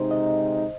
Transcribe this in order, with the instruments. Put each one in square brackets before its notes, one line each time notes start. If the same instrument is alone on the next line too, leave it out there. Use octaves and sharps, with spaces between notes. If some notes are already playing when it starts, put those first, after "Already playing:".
Already playing: [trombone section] C3 G#3 D#4 [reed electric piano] C5
[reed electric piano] D#5